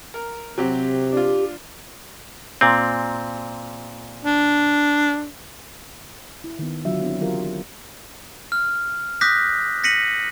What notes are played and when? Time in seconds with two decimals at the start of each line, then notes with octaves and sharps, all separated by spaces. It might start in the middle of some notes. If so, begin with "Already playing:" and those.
0.14 A#4
0.58 C3 F#3 C4 G4
1.13 D4 F4 G4
2.61 A#2 C4
4.25 D4
6.44 E4
6.59 D#3 B3
6.85 D3 F#3 D4 F4 E5
7.01 B3 C4 D4 E4
7.20 D3 E3 F#3 F4 G4 A#4
8.52 F6
9.21 D6 D#6 F#6 G6 A#6 B6
9.84 A#6 B6 C#7 D#7 F#7